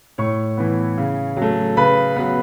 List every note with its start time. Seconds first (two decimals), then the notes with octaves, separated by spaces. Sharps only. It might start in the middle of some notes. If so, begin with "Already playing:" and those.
0.18 A2 C#5 C#6
0.57 E3 B3
0.97 C#3
1.37 F#3 A3
1.77 C#3 B4 B5
2.16 F#3 B3